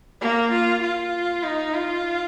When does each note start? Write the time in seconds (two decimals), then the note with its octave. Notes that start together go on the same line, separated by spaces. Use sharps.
0.21 A#3
0.52 F4
0.82 F4
1.43 D#4
1.73 F4